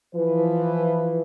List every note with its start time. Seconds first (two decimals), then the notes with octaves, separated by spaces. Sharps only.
0.15 E3 F3 B4